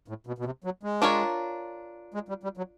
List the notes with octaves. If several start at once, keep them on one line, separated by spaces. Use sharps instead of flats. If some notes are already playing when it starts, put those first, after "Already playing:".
A2
B2
B2
C3
F#3
G#3
D4 F4 A#4 C#5
G#3
G3
G3
F#3